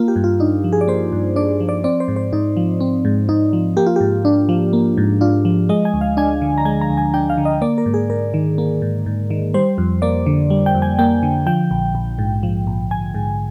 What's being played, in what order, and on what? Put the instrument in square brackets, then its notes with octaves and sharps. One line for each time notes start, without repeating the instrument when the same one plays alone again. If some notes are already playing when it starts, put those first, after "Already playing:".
Already playing: [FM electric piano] A#3 F4
G4
G2
F4
D4 D#4
F3
G#4
D5
A#3 C5
G2
D4 D5
F3
D5
C4 D5
C5
G#2
C5
G#2 D#4
F3
C4
G#2
G#2 D#4
F3
A#3 G4
F4
G#2 G4
D4
F3
A#3
G#2
D4 F4
F3
G#3 D#5
G#5
D2
F5
D4 G#5
D3
A#5
G#3 G#5
A#5
D2
G#5
D4 G5
F5
D3
D#5
A#3 D5
A#4
G#2
G#4
G#2 A#4
D#3
A#3
G#2
G#2
D#3
G3 C5
F2
A#3 D5
D3
G3
G5
F2
G#5
A#3 G5
D3
F3 G5
A#1
A#1
G#2
F3
A#1
A#1 G#5
G#2